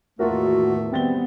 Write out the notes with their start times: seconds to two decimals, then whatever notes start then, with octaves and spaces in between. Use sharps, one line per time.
0.19 E2 A2 D#3 A3 A#3 F4 F#4 A#4
0.92 D#3 G3 B3 C4 A6 G7